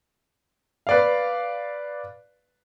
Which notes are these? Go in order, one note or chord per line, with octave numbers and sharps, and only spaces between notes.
B4 D5 F5